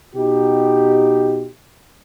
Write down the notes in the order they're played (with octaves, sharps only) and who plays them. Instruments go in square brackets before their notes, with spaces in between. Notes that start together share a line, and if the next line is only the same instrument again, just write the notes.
[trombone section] B2 D#4 G4